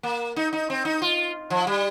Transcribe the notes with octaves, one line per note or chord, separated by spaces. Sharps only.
A#3
D#4
D#4
C4
D#4
F4
F3
G3